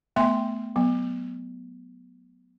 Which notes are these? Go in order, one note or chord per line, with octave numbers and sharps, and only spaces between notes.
A3 B3 E5 G5 G#5 C6
F#3 B3